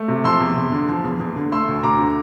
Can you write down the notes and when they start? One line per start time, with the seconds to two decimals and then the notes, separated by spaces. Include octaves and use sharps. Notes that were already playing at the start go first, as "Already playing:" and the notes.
Already playing: A3
0.08 C3
0.24 F3 C6 E6
0.40 E2
0.57 E2
0.72 D3
0.89 F3
1.04 E2
1.20 E2
1.36 D3
1.52 A3 C6 E6
1.68 D2
1.83 D2 A#5 D6
1.99 D3